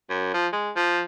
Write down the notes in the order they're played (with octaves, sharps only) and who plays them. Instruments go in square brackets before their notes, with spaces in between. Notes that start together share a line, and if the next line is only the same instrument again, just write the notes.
[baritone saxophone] F#2
F3
G#3
F3